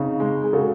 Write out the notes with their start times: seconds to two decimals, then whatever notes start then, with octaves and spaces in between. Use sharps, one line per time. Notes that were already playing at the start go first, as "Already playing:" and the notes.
Already playing: C#3 C4 D#4
0.20 G#3
0.43 G#4
0.53 C#3 F#4 A4